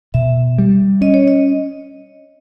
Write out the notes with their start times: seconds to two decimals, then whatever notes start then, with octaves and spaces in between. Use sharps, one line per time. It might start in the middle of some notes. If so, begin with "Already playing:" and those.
0.14 B2 E5
0.58 G3
1.01 C#4 D#5
1.14 C#5
1.28 D#5